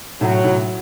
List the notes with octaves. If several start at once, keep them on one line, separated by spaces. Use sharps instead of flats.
A2 F#3
A2